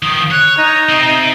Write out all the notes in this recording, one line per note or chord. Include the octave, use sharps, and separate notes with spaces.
D#3 F3 D#6
C#5 F#6
D#4
C3 C4